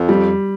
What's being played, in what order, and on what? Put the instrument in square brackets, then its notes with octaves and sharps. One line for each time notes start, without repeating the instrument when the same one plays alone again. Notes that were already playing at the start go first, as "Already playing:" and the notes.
Already playing: [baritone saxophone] F2
[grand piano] G3